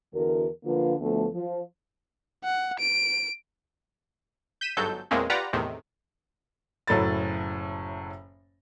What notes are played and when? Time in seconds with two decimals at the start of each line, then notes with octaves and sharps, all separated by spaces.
0.14 E2 D3 F#4 A#4
0.65 D3 F3 A#3 F4 B4
1.00 D2 F3 A3 B3 A4
1.34 F3
2.44 F#5
2.80 D7
4.61 G6 B6 D#7 E7
4.77 G1 G#2 F#3 A4 G6
5.11 E2 A#2 G#3 A#3 C4 C#4
5.30 F4 G4 B4 D5 F#5 A#5
5.53 E2 A2 C3 D#3
6.87 F#1 A2 F#3 A4 B5 A6